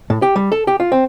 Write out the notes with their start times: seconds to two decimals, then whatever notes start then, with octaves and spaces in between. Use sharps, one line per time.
0.10 A2
0.22 G4
0.36 G3
0.52 A4
0.67 G4
0.80 F4
0.92 C4